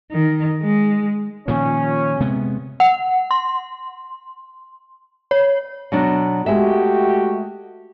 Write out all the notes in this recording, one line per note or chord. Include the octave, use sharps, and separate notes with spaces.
D#3
G#3
A#2 D#3 F3 C#4
C3 G#3 B3
F#5
C6
C#5
B2 F#3 D4
G#3 A3 F#4 G4 E5